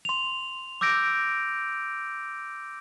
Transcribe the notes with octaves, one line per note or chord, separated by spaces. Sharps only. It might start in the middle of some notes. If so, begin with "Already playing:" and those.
C6 F7
D6 E6 G6 A#6 D7